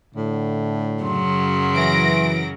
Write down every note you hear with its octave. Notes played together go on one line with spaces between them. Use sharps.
A2 D3
F#2 C#3 F#3 C6
E3 A#6 D7